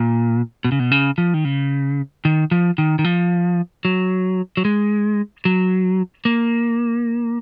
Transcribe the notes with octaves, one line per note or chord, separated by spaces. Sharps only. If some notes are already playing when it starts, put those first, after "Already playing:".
Already playing: A#2
B2
C#3
B2
C#3
F3
D#3
C#3
D#3
F3
D#3
D#3
F3
F#3
F#3
G#3
F#3
A#3